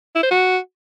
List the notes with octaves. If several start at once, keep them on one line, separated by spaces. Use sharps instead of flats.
E4
C5
F#4